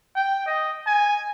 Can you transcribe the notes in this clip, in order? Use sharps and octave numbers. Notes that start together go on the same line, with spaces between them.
G5
D#5
G#5